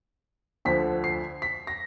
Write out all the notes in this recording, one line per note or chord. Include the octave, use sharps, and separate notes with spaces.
D2 D3 F3 B6
C7
B6
A#6